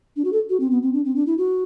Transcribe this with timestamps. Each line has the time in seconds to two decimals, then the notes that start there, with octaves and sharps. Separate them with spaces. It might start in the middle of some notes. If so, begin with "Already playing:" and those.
0.16 D4
0.24 F#4
0.32 A4
0.50 F#4
0.60 C4
0.71 B3
0.83 C4
0.93 D4
1.05 C4
1.15 D4
1.27 E4
1.38 F#4